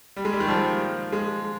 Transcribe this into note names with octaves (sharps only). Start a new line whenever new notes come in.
G3
G#3
G3
D#3
F3
G#3